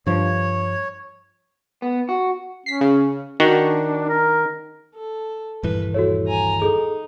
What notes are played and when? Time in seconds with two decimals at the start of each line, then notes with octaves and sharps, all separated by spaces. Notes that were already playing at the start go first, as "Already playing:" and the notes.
0.06 G2 F3 C#5
1.82 B3
2.09 F#4
2.66 C#4 B6 C7
2.81 C#3
3.40 D#3 D4 F#4
4.10 A#4
4.95 A4
5.63 D#1 G2 E3 B4
5.94 E4 F#4 A4 C#5
6.27 G#5 A#5
6.62 D#4 G#4 A4